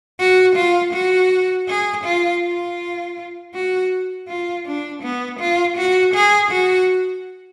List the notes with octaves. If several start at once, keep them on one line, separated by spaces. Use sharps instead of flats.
F#4
F4
F#4
G#4
F4
F4
F#4
F4
D4
B3
F4
F#4
G#4
F#4